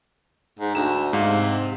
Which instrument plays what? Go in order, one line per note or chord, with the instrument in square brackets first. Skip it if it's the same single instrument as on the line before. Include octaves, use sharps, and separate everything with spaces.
[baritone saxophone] G#2
[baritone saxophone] D2 [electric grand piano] E7
[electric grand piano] G#2 F5
[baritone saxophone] C3